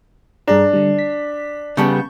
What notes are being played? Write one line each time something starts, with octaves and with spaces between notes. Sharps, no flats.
G2 D4 G#4 A#5
D3 G3
B6
C#3 G3 B3 A5 C#6 G6